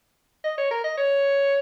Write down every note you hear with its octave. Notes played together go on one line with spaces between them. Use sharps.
D#5
C#5
A#4
D#5
C#5